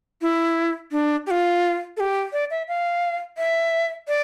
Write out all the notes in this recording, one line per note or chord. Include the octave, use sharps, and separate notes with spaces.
E4
D4
G4
F4
A4
G4
D5
E5
F5
E5
D5